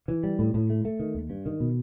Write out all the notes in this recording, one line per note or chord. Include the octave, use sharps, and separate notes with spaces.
E3
G3
A2
A2
A3
A3
D#3
D#2
G2
D#3
B2